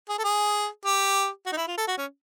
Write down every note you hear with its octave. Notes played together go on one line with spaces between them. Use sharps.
G#4
A4
G#4
G4
F#4
D#4
E4
F4
A4
F#4
C#4